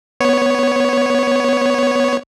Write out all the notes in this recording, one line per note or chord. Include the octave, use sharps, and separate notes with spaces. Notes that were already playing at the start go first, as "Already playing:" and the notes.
B3 C#5